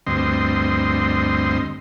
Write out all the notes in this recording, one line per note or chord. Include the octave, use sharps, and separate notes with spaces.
D2 G2 C4 D#5 C6